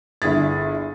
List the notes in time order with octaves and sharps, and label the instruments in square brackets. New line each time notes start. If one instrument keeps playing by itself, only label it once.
[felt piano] G1 E4 G#4 A6